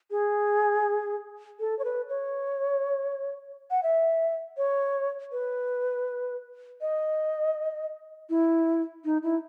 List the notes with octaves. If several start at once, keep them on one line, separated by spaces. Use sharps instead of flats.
G#4
A4
C#5
B4
C#5
F#5
E5
C#5
B4
D#5
E4
D#4
E4